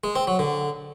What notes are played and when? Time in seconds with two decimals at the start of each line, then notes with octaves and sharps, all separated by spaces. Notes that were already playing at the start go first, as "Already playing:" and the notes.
0.04 G#3
0.15 C4
0.27 F#3
0.39 D3